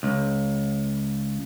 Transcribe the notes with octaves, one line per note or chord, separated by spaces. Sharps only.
C#2